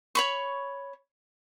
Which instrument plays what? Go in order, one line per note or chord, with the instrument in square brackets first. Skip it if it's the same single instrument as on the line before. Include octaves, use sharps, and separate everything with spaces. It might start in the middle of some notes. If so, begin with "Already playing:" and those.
[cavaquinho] C#5 B5 C#6